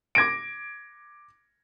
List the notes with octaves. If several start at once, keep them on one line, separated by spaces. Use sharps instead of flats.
D6 G#6 A#6 D7